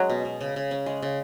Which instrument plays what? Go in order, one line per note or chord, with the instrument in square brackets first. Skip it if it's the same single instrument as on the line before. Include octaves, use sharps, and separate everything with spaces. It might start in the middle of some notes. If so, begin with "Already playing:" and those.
Already playing: [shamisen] F#3 [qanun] G#3 C#4
[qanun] B2
B2
C#3
C#3
C#4
G#3
C#3